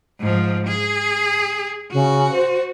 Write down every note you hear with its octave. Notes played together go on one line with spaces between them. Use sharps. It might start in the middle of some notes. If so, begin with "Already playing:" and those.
G#2 F3
G#4
C#3 F#4
C5